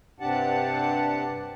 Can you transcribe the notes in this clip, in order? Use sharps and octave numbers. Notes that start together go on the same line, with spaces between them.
G2 C3 D4 G4 F#5 A5